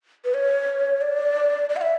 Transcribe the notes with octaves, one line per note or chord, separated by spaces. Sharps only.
B4
C#5
D5
D5
F#5
E5